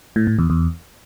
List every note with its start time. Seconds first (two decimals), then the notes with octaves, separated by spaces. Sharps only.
0.16 A2
0.27 A2
0.38 E2
0.50 E2